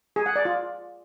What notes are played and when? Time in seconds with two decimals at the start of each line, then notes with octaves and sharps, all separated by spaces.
0.16 G#4
0.26 F#5
0.36 D5
0.45 F4